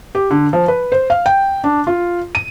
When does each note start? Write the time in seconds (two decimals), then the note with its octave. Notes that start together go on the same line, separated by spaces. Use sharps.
0.15 G4
0.31 D3
0.53 F3
0.68 B4
0.92 C5
1.10 F5
1.26 G5
1.64 D4
1.87 F4
2.35 D#7